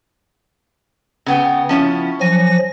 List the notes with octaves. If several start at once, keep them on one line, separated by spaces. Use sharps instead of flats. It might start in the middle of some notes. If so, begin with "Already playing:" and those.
C#3 B3 G5
F3 C#4 E4
F3 F#3 G#5 A#6